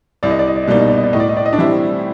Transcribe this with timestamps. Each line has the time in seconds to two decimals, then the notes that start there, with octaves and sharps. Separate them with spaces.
0.23 C2 D5
0.31 D#5
0.39 D5
0.48 D#5
0.56 D5
0.63 D#5
0.67 B2 G3 A#3 D#4 D5
0.79 D#5
0.88 D5
0.96 D#5
1.04 D5
1.13 A2 D#5
1.20 D5
1.29 D#5
1.37 D5
1.46 D#5
1.53 D4 D5
1.58 E3 G3 C4 E4